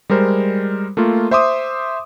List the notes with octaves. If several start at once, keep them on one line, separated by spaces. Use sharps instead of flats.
G3 G#3 A#4 C5
A3 A#3 F4
C5 E5 C6 D6 D#6